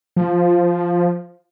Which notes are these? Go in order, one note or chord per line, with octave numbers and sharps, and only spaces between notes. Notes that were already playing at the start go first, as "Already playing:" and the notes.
F3